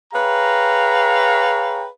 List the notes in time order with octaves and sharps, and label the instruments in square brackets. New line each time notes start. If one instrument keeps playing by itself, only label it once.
[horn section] G#4 B4 C#5 F5 G5 A#5